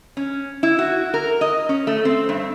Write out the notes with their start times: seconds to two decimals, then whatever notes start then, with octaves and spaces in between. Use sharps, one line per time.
0.17 C#4
0.63 E4
0.79 F#4
1.14 A#4
1.41 D#5
1.69 C#4
1.87 A3
2.05 C4
2.29 G2